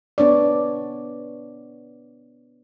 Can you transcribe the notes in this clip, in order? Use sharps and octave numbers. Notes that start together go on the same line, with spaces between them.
B3 D4 C#5 D5